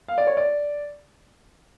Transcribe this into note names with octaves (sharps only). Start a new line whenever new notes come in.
F5
D5
C#5
D5